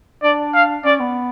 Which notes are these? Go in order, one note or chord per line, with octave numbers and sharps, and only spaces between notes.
D4 D5
F5
C#4 D5
B3